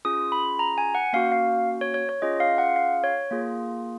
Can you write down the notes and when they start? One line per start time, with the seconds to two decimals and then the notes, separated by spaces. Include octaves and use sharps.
0.05 C#4 F4 G#4 D#6
0.32 B5
0.59 A#5
0.78 G#5
0.95 F#5
1.13 A#3 C#4 F#4 F5
1.32 F5
1.81 C#5
1.94 C#5
2.09 C#5
2.22 C#4 F4 G#4 D#5
2.40 F5
2.58 F#5
2.76 F5
3.04 C#5
3.31 A#3 F4 G#4